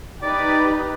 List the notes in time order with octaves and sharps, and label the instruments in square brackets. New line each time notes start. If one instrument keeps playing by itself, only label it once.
[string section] D#4 G4 B4 [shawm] D5